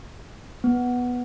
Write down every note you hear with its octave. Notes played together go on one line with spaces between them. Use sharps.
B3